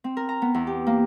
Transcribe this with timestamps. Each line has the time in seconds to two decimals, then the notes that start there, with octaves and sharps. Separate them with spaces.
0.04 C4
0.17 A#4
0.29 A#5
0.42 B3
0.54 E2
0.67 G4
0.87 A#3